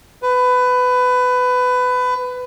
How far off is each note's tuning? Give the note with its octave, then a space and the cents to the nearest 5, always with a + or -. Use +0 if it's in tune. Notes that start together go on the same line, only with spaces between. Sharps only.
B4 +20